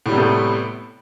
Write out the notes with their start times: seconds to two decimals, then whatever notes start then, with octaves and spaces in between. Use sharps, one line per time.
0.06 A2
0.09 G3
0.12 C3
0.15 B3
0.18 A3